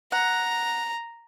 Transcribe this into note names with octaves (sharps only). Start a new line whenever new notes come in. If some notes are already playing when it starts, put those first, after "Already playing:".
F#5 A#5